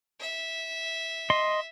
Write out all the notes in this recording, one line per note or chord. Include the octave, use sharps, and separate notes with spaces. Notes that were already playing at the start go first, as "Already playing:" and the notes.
E5
D#5 C6